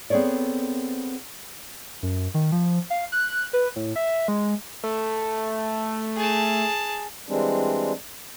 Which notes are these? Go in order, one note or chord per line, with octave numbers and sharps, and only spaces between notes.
B3 C4 G#4 A4 C#5 D5
F#2
D#3
F3
F5
F#6
B4
A2
E5
G#3
A3
G#4 A5
E3 G3 G#3 C4 D4